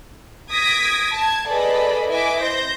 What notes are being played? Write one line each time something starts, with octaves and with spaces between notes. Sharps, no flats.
D#6 G#6 A#6 B6 D7
A5 G#6
G#4 A4 B4 D5 D#5 B5
E4 B4 D#5 E5 G#5 D6
C5 G6 A#6